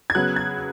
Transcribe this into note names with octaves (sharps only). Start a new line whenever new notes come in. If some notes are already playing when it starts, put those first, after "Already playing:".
G#6
C#3 F#3 B3 F#6
G#6